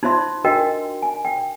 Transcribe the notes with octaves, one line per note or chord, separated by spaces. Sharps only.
D#4 F4 C5 E5 C6
D4 F#4 A#4 D#5 G5
G#5
G5